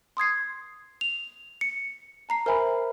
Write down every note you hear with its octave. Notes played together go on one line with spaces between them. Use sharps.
C6 D#6 G#6 C7
F7
C#7
A5 A#5 C7
A#4 C5 E5 G#5 B5